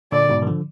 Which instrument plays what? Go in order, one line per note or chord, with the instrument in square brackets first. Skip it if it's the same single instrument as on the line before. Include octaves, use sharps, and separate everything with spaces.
[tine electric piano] A#2 D3 [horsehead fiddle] D5
[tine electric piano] G#2 B2
D#3
D3 F3